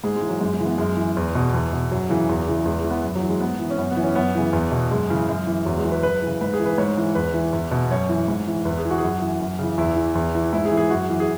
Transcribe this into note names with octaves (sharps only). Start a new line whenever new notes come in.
G#2 G#4
G#3
E3
F#3
F#2 G#3
G#3
C#3 E3
B3
F#2 G#3
E3
E2
B2
E2
B2
F#2 F#3
C#3 E3
E2
C#3 E3
E2 G#3
G#3
E3
B3
F#2
F#3
E3
G#3
G#2 B3
E3
C#4
F#2 B3
B3
E3
C#4
F#2 B3
C#3 E3
E2
B2
F#2 G#3
C#3 E3
F#2
E3
E2 F#3
G#3
E3
B4
F#2 B4
C#3 E3
G#2 B4
G#4
E3
B4
G#2 C#5
E3
E2 B4
E3
E2
B2
F#2 C#5
E3
G#2
E3
E2 B4
G#4
E3
F#4
G#4
F#2 F#4
E3
F#2
C#3 E3
E2 E4
E3
E2
E3
G#2 E4
G#4
E3
G#4
F#2 F#4
E3
G#4